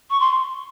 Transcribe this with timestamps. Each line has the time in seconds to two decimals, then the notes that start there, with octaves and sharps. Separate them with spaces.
0.10 C#6
0.20 C6